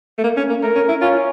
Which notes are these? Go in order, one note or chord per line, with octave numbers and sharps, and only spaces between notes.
A3
A#3
C#4
A#3
A3 A#4
C#4
E4
C#4 F4